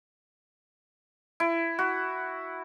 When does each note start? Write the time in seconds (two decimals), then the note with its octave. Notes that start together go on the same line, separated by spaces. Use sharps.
1.40 E4
1.79 F#4